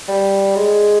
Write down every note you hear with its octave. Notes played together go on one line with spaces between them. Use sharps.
G3
G#3